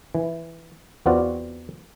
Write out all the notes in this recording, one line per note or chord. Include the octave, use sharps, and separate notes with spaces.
E3
E2 B3 C4 F4 F#4 D5